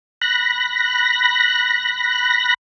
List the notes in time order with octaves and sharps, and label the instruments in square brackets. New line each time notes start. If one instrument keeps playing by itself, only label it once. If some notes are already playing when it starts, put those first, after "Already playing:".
[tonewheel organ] B5 F#6 A#6